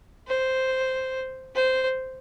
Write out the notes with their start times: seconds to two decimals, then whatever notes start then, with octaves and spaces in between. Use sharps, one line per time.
0.28 C5
1.55 C5